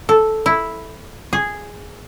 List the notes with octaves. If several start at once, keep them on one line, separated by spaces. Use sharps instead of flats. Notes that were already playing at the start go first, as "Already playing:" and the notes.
A4
E4
G#4